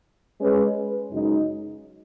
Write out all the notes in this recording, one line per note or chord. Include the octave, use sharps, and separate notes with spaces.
G#3 C#4 G#4 B4
F#2 C#3 G#3 D#4